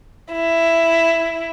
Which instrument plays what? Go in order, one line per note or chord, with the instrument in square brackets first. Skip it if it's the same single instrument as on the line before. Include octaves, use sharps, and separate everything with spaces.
[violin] E4